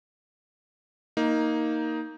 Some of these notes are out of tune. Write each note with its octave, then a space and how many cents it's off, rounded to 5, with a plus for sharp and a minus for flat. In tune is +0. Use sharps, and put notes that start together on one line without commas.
A#3 +0 D#4 +10